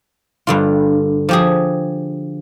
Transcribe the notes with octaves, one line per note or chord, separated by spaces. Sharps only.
G2 D3 F4
F3 G4 G#4